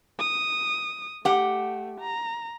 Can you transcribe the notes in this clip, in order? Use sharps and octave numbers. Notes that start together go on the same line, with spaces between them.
D#6
A3 G4 F#5
A#5